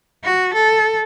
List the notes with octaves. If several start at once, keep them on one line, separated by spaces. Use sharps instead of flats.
F#4
A4